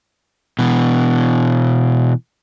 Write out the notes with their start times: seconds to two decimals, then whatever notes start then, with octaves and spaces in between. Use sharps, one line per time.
0.59 B2 E3